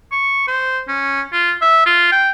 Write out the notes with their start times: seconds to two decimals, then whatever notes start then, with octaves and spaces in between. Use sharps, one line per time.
0.12 C#6
0.48 C5
0.88 C#4
1.33 F4
1.61 E5
1.86 F4
2.12 G5